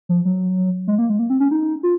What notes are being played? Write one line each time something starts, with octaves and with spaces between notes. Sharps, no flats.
F3
F#3
G#3
A#3
G#3
A#3
C4
C#4
D#4
F4